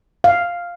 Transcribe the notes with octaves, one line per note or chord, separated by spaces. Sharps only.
F5